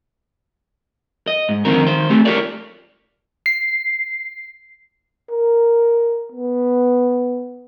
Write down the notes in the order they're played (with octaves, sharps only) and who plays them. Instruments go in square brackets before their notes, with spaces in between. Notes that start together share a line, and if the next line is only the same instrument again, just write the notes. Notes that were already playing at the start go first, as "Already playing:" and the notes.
[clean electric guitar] D#5
G#2
F2 D3 D#3 C4 A#4
D#3 C5
A3 C4 G4
F4 G4 A4 A#4 C#5 D5
[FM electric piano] C7
[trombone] A#4
B3